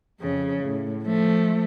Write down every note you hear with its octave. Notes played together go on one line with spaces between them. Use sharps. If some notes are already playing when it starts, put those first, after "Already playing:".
F2 C#3
A2
F3 A3